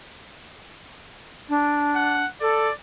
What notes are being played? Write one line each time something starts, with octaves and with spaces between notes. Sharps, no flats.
D4
F#5
A4 D5